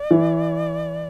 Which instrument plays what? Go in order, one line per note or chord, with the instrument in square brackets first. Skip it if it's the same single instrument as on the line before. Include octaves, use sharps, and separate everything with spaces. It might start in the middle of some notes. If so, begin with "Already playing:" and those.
Already playing: [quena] D5
[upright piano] E3